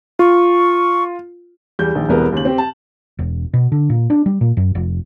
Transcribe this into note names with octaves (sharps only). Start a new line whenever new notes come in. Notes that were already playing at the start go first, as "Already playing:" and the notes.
F4 C#6
E2 G3 G6
A#1 D#3
E1 C2 E3 B3 A#4
D#2 C#3 F#7
C4 G4
A5
E1
B2
D3
A#2
D4
G3
A#2
F#2
F1